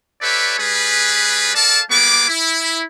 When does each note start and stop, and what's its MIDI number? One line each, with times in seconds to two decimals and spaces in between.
0.22 0.56 67
0.22 0.56 69
0.22 0.56 71
0.22 0.56 73
0.22 0.56 74
0.22 0.56 76
0.59 1.53 55
0.59 1.53 61
0.59 1.53 68
0.59 1.53 71
1.55 1.81 69
1.55 1.81 70
1.55 1.81 74
1.55 1.81 77
1.55 1.81 81
1.91 2.28 55
1.91 2.28 58
1.91 2.28 59
1.91 2.28 68
1.91 2.28 86
2.28 2.83 64